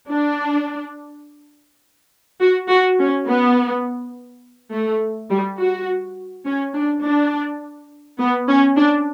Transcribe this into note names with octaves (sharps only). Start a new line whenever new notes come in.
D4
F#4
F#4
C#4
B3
A3
G3
F#4
C#4
D4
D4
B3
C#4
D4